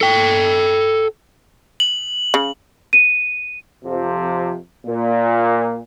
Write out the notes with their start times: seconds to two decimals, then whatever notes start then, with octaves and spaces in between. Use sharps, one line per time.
0.01 A4 G5
1.80 F#7
2.34 C#3
2.93 D#7
3.84 F2 C3 F3
4.86 A#2